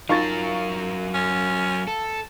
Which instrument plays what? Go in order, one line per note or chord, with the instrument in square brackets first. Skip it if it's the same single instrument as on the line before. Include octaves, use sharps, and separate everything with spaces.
[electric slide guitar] F#3 A#4 [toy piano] D#4 F4 [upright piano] F5 C#6 A6
[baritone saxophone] C#4
[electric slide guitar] A4